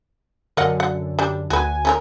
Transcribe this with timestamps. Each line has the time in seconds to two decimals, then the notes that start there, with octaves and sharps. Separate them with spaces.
0.57 F#2 D3 A#4 D#5 F#5
0.80 F#5
1.19 G3 D4
1.50 D2 F#4 B4 G#5
1.85 C#4 A4 A#4